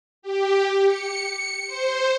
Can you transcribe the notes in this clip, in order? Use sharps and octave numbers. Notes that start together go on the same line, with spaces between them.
G4
C#7
C5